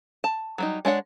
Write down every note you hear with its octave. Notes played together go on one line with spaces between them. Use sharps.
A5
F#3 G3 D#4
G#3 D4 C#5 F#5